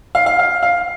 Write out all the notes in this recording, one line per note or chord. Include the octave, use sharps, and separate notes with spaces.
F5
F5
F5
F5